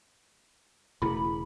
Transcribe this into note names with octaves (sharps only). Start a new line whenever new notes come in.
E1 C#3 A3 E4 G#4 B5